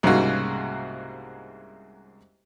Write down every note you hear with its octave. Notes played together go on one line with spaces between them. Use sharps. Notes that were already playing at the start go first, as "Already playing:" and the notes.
C2 G#2 C#3 G#3 A#3 F#4